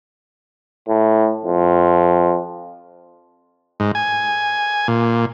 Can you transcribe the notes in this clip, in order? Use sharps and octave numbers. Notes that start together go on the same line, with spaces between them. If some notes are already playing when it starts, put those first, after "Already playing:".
A2
F2
G#2
G#5
A#2